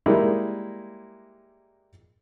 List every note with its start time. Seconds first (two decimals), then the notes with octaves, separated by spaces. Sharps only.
0.06 G3 G#3 A#3 D#4 E4